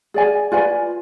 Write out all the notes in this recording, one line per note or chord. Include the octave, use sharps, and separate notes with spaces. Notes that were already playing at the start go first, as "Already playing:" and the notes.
G#4 D5 G#5
F4 B4 D5 G#5